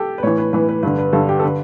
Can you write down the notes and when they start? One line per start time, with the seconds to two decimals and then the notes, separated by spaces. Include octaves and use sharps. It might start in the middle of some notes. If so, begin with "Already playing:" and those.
Already playing: G4 A4
0.18 B4
0.23 A2 E3 C#5
0.38 B4
0.53 A2 E3 B4
0.69 B4
0.83 G2 D3 B4
0.99 B4
1.13 G2 D3 A4
1.29 G4
1.40 A4
1.44 D3 B4